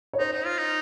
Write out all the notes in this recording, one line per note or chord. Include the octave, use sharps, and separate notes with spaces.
C#5
D#4 C5
D#4
F4
D#4